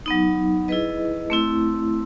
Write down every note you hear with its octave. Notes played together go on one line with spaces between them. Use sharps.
F#3 B3 D#4
E4 G#4 B4 D#5
A3 C4 E4